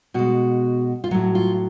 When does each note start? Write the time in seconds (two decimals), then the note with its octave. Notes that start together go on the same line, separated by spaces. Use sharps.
0.14 B2 G#3 F#4
1.04 F4
1.11 A2 F#3 F#4
1.35 F4